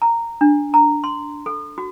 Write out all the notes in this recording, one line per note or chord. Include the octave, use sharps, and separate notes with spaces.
A#5
D4
A#5
C6
A4
F#4